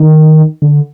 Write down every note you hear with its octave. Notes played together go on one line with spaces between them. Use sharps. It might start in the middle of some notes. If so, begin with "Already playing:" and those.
Already playing: D#3
D3